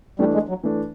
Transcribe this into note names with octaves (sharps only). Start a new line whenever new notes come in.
E3 G3 A3 D4
G#3
F#3
E3 A3 D4